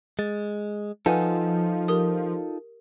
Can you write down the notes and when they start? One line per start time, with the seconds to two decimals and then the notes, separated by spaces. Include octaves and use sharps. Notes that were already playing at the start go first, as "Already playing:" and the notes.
0.19 G#3 A6
1.06 F3 D#4 F4 A4 B4 F#5 G#5
1.88 G4 A#4 D#6